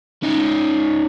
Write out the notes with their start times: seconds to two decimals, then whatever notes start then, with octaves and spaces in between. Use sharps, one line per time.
0.23 C#4 D#4